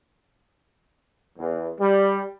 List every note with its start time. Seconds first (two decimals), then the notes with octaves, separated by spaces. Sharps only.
1.38 E2
1.80 G3